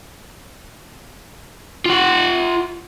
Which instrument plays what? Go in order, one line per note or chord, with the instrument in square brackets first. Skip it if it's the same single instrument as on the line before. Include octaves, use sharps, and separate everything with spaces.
[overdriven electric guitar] F4 F#5